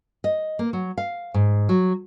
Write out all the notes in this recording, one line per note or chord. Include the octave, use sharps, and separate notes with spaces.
D#5
A#3
F#3
F5
G#2
F#3